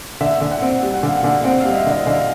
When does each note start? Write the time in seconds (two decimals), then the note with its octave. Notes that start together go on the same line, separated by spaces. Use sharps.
0.21 D3 E5
0.41 D3
0.51 F#5
0.62 C4
0.83 G3
0.94 F#5
1.03 D3 F5
1.17 F#5
1.24 D3
1.44 C4 F#5
1.61 G3 F5
1.71 D#5
1.76 E5
1.86 D3
1.92 D#5
2.06 D3 F5